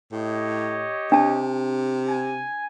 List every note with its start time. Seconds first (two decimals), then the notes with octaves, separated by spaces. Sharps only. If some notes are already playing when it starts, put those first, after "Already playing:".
0.12 A2 G4 C#5 D#5
1.12 C3 D4 A5
2.06 G#5